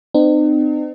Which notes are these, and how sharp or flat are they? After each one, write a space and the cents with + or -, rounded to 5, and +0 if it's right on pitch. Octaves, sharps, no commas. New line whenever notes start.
C4 -40 D#4 -45